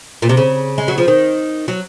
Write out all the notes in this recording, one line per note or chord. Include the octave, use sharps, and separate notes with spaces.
A#2
C3
C#3
G#3
F#3
F3
D#3
F#3